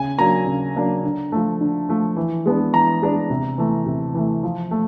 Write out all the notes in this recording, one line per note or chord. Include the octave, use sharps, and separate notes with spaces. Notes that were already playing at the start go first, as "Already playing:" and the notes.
Already playing: C#3 G#5
F#3 A#3 D4 A#5
C#3
F#3 A#3 D4
D3
F3 A3
D3
F3 A3
E3
G#3 B3 D4
E3 A#5
G#3 B3 D4
C3
E3 A3
C3
E3 A3
F3
A3